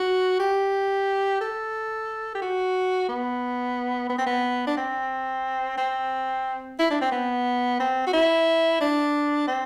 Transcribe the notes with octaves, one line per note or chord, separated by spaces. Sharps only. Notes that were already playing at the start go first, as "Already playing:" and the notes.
Already playing: F#4
G4
A4
G4
F#4
B3
B3
C4
B3
D4
C4
C4
E4
D4
C4
B3
C4
F#4
E4
D4
C4